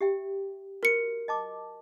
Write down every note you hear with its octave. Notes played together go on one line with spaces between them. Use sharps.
G4 E5 G5
F#4 A#4 C#7
D#5 A5 D6